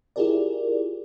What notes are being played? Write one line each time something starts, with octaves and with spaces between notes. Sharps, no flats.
E4 F4 G4 G#4 A#4 D5